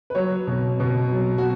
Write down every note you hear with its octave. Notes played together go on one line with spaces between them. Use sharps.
B4
F#3 C#5
B2
B2
F#3
F#4